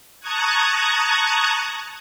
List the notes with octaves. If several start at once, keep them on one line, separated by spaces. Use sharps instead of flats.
A5 A#5 C#6 D#6 F#6 G#6